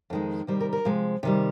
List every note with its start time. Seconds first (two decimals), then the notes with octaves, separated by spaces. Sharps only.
0.10 F2 D#3 G#3
0.47 C3 D#3 G3 C5
0.60 A#4
0.73 A#4
0.85 C3 F3 G#3
1.23 C3 D#3 G3